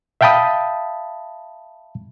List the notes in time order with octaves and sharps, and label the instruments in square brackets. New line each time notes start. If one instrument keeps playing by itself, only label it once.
[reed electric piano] E5 F5 G5 A5 B5 D#6